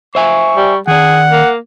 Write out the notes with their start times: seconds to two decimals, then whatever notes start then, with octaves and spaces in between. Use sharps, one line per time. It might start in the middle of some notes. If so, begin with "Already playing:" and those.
0.15 C5 E5 G#5 C#6
0.57 G3
0.87 D#3 G#4 D5 F#5
1.31 A#3